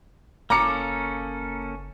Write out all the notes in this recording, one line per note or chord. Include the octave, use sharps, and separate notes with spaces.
F#1 A#3 C#4 A4 A#5 D6 C#7